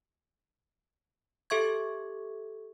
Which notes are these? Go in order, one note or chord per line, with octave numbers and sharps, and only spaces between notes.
G4 A4 E5 C#6 G#6